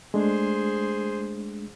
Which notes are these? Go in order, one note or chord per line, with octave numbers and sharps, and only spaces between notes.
G#3 A3 D4 G#4 C5